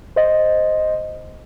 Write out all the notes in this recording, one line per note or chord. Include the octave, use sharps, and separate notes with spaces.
C5 D#5